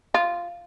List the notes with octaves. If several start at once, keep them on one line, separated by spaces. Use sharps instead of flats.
F4